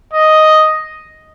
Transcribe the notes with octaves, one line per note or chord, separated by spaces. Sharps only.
D#5